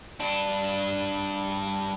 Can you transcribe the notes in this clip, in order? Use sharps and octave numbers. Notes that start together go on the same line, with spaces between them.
G2 D4